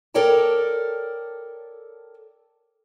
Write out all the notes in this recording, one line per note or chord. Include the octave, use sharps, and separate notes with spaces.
A4 A#4 C#5 D5 G5 A5